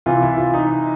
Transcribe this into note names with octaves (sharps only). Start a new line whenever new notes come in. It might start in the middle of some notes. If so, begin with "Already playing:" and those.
C3 E3 F4
E4
F4
D#4